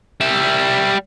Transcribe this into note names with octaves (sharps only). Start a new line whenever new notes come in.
G3 E5